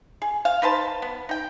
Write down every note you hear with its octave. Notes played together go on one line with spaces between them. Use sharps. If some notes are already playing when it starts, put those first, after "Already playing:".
G#4
F5
D#4 B4 C5 A5
B3
D#4 G5